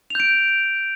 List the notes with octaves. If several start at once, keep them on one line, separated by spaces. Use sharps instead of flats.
G6 D7 F7